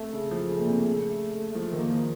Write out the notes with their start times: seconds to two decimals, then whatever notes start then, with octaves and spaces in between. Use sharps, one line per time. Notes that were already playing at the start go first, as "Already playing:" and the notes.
Already playing: C3 A3
0.13 C#3
0.31 F3
0.48 C#3
0.58 A#2
0.67 C3
0.84 C#3
1.55 F3 A3
1.72 D#3
1.78 A#3
1.90 F3